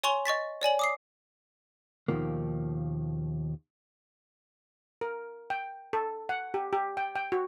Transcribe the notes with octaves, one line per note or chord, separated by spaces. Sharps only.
C#5 G#5 C6 C#6 F7 G7
D#5 C#6 A6 B6
C#5 D5 G#5 F#7
D6 D#6 C7
D#2 B2 D#3 F3 A#3
A#4
G5
A4
F#5
G4
G4
G5
G5
F#4